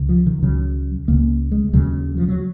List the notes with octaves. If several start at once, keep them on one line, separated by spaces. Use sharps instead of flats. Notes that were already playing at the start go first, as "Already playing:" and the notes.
Already playing: C#2 C#3
F3
D#3
C#2 C#3 F#3
C#2 C#3 A#3
G#3
D#2 C#3 F#3
F3
F#3